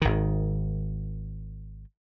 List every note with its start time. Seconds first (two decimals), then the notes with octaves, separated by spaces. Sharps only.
0.02 G#1 D#3